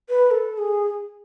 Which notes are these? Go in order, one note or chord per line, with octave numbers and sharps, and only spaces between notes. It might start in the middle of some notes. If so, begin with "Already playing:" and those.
B4
A4
G#4